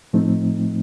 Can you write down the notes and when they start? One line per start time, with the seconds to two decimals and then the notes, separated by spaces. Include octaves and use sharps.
0.13 A2 F3 A3 C4 D#4